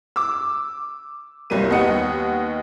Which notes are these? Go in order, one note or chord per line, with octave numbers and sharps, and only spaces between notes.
D6 E6
F#1 C2 F#3 G3 A#3 D#7
D#2 B3 D#5 F#5 C#7